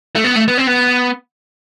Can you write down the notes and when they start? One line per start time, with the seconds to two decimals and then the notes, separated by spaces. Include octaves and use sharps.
0.16 A3
0.24 B3
0.35 A3
0.48 B3
0.58 C4
0.67 B3